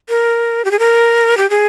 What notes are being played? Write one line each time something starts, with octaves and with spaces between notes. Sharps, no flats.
A#4
G4
G#4
A#4
G4
G#4